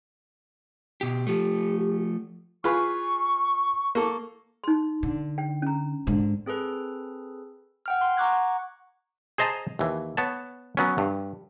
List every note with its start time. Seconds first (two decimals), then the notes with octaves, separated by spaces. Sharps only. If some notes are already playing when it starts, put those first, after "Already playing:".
1.01 B2 G4
1.27 F3 A3 G4
2.64 F4 G#4 B4 C#6
3.95 A#3 A4
4.64 D#4 C6
5.03 D3
5.38 G5
5.62 C#4 A#5
6.07 G#2 D3
6.46 C4 G#4 A4 B4
7.86 F#5 G5 F6
8.01 C6
8.17 F#5 A#5 C#6 D6 F#6 G#6
9.38 G#4 C5 D#5 A5 A#5
9.79 D#2 E3
10.17 B3 C#5 A5
10.77 F#3 B3 C#4
10.98 G2